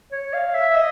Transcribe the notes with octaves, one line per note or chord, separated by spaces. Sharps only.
C#5
F5
E5
D#5